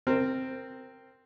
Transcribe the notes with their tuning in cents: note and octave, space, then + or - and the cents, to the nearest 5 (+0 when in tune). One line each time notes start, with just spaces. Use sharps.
C4 +0 A#4 -15